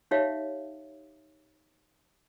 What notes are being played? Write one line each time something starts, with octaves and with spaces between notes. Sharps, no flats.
D#4 G4 C#5 E5 F5